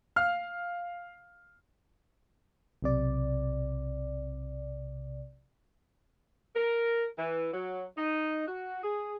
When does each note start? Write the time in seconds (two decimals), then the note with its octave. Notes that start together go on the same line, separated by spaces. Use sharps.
0.16 F5 F6
2.82 B1 C3 D5
6.56 A#4
7.17 E3
7.53 F#3
7.97 D#4
8.47 F#4
8.83 G#4